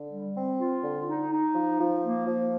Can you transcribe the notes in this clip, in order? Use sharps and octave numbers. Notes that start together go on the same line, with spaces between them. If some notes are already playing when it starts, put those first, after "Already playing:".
Already playing: D3
G3
C4
F4
D3
D#4
D#4
F3
F3
A#3
F3